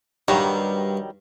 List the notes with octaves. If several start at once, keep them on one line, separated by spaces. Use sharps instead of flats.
G2 D#3 F#3 G3